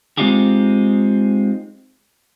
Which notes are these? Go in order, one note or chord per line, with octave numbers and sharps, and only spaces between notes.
G#3 C4 D#4 F4 G4 G#4